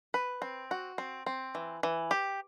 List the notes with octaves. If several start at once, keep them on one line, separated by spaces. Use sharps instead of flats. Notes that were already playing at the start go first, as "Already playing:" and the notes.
B4
C4
F#4
C4
C4
E3
E3
G4